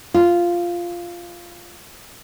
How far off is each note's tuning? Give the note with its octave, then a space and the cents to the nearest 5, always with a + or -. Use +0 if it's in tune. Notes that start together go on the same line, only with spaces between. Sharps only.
F4 -5